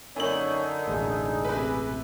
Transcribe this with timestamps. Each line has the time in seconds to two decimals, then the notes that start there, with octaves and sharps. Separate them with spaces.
0.16 F#2 D3 A#3 D#4 C#5 F#7
0.88 E1 A1 G#4
1.45 C3 B4